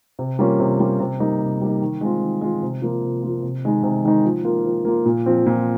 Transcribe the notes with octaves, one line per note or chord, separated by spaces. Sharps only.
C3
G3 A#3 C#4 F4
C3
G3 A#3 C#4 F4
C3
G3 A#3 D#4
C3
G3 A#3 D#4
D#3
G#3 C4 F4
D#3
G#3 C4 F4
C3
F3 A#3 F4
C3
F3 A#3 F4
C3
D#3 G#3 D#4
C3
D#3 G#3 D#4
F3
A#3 F4
F3
A#3 F4
A#2
F3 C4
A#2